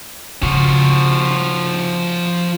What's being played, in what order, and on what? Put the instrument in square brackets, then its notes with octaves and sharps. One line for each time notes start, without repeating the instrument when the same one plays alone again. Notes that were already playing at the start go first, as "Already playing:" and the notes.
[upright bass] C#3 [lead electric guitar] F3 F#4